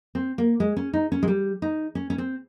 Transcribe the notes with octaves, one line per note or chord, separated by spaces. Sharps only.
C4
A#3
G#3
C#4
D#4
C#4
G#3
G3
D#4
C#4
C#4
C4